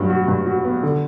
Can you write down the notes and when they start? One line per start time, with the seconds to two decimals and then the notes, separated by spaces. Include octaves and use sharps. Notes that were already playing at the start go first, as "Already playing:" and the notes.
Already playing: G2 F#3
0.10 F#4
0.28 G2
0.46 F#4
0.64 B3
0.83 D3